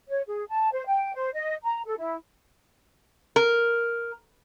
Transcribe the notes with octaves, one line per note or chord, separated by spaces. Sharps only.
C#5
G#4
A5
C5
G5
C5
D#5
A#5
A4
E4
A#4